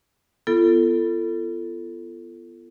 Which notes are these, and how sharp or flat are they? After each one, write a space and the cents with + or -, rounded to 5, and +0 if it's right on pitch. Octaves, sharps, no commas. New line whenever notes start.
B3 +0 F4 -35 A4 +10